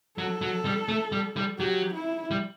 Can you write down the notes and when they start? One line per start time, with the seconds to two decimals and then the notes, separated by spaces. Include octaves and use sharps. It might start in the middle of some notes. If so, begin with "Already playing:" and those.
0.18 F#3 A4
0.41 F#3
0.65 G3
0.88 A3
1.12 G3
1.36 G3
1.59 F#3 G4
1.94 E4
2.31 G3